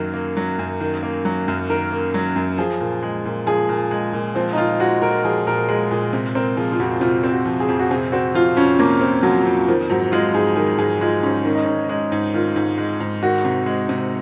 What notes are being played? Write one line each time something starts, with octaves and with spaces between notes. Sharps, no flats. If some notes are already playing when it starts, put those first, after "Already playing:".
Already playing: F#2 D#3 F#3 A#3
A#3
F#3
F#2
D#3
A#3
F#3
F#2
D#3 A#4
A#3
F#3
F#2
F3 G#4
A#2
G#3
A#2
F3 G#4
A#2
G#3
A#2
F3 C4
D#4
A#2 F4
G#3 F#4
A#2 A#4
F3 G#4
A#2 A#4
G#3 G#4
A#2 G#4
C3
C4 A#4
F3 G#4
F4
F2 F#4
C3 F4
C4
F#4
F3
G#4
F2
F#4
C3 G#4
C4 F#4
F3 F4
F2 C#4
C3 A#3
C4
F3 F#3
F2
D#3 F3
G#2 F#3
G#3 F4
G#2 G#4
D#3 G#4
G#2 G#4
G#3 F4
G#2 C#4
D#3 C#4
D#4
G#2 C#4
G#3 D#4
G#2
D#3 F4
G#2
G#3
G#2
D#3 F#4
C3
G#3
C3